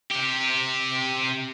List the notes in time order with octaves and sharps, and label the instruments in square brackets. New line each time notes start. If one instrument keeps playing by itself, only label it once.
[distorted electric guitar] C3 G4